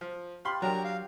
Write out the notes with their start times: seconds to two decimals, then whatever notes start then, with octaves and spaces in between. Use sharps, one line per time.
0.01 F3
0.45 F4 G4 F5 B5 C6
0.62 F#3 D4 G4 A#4 A#5
0.84 F5